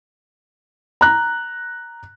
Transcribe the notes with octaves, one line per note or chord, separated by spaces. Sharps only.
A#5 F#6